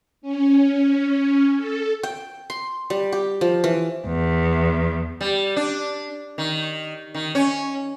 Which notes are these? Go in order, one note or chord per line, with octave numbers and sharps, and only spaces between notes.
C#4
A4
G5
C6
G3
G4
F3
E3
E2
G3
D4
D#3
D#3
C#4